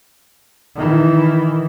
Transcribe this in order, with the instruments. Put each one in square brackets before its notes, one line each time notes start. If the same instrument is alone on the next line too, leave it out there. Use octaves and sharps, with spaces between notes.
[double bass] D#3 E3